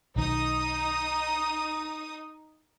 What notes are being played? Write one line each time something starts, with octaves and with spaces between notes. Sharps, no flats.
B1 D#3 D#4 D#6